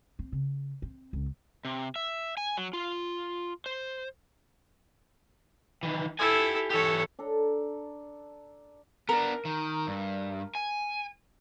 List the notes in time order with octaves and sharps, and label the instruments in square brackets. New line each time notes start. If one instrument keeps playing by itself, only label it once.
[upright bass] C4
C#3
C4
C#2
[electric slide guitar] C3
E5
G#5
F#3
F4
C5
[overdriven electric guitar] D#3 E3
[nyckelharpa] E4 A4 [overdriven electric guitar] G4 G#5
[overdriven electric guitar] E3 G4 [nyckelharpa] A4 C#5
[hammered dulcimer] D4 A4 A#5
[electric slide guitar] B3 D4 [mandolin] A#4
[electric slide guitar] D#3
G2
G#5